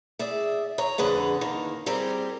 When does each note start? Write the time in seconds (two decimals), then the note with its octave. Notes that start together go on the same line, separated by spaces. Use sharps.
0.19 G#4 D5 E5
0.78 C#5 A#5
0.98 F2 D3 G#4 B4 F#5
1.41 D#3 A#3
1.86 G3 C4 G4 G#4 A#4